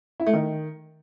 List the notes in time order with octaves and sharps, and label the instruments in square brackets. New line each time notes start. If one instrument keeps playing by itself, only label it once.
[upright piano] E4
A3
D#3